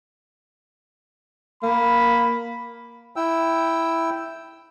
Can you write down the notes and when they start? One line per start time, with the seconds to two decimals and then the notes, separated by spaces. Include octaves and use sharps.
1.63 A#3 B5
3.16 E4 G5 E6